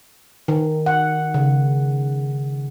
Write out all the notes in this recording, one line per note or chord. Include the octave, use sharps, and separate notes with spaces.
D#3
F#5
C#3